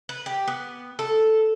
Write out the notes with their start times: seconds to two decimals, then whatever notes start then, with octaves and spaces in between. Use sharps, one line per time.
0.09 B4
0.26 G4
0.48 B3
0.99 A4